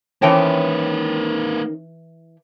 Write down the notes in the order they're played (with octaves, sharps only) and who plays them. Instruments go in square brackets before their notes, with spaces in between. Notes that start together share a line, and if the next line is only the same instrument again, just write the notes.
[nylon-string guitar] D#3 C4 C#4 [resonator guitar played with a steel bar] E3 G5 A5 [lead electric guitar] A#3 B4